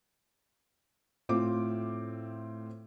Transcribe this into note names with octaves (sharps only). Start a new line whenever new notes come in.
A2 C4 F4 D6